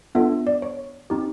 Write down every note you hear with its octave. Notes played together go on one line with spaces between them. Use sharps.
B3 D4 F4 A4 E5
D5
C#5
C4 D#4 G4